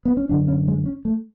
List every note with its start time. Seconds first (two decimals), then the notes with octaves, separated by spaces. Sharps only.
0.05 B3
0.17 C#4
0.29 F#2 D3 D4
0.48 C#4
0.68 G#3
0.86 C#4
1.05 A3